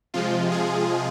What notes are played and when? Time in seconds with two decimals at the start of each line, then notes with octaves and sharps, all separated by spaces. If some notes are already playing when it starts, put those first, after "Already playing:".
0.14 C3 F3 G#3 F4
0.52 G#4